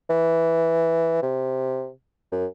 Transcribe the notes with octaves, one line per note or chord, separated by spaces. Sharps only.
E3
C3
F#2